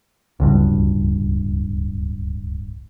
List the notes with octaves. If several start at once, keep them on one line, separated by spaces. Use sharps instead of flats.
D1 C#2 G2